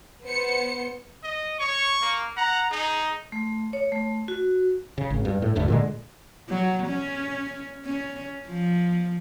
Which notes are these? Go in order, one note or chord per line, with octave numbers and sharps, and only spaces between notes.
B3 C5 C#7
D#5
C#5 C#6
A#3
F#5 A#5
D#4 G#4
A3
C#5
A3
F#4
C#3
G#1
G2
A2
E1 D2 G2 A3
A#2 D3 G#3
F#3
C#4
C#4
F3